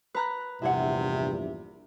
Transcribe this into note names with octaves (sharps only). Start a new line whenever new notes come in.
B4 A#5 F#6
A#1 E2 G2 C3 E4 F#5